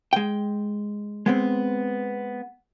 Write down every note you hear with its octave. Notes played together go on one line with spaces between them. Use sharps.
G#3 G5
G#3 B3 C4